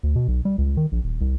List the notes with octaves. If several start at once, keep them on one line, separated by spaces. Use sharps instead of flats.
D2
B2
B1
G3
C#2
D#3
A#1
D#1
C2